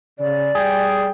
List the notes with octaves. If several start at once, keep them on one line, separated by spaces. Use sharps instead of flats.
C#3 D5
G3 G#4 G5